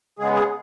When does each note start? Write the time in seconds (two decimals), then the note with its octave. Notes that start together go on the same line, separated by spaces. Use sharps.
0.19 C#3 G#3 B3 G#4
0.33 G#4